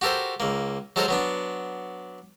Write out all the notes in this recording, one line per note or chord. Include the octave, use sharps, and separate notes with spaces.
F#4 G4 A4 A#4 C5
C#2 A#3
F#3 G#3 A4 A#4 C5 C#5
F#3 B3 D4